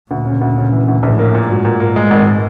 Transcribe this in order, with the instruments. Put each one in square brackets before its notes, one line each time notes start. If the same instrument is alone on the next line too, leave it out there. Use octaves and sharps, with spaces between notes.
[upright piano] D2 [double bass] A#2
[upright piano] C#3
D2
C#3
E3
D2
[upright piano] A#1 [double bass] A2
[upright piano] A#3
A#2
[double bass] G#2 [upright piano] F#3
[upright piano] A#2
A#3
G#3
G#1